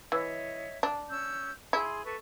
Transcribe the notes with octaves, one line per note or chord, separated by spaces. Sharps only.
E3 C#5 D#5 E5
D4
C#4 E6 G6
E4 G#4 C6
A4 B4 C#6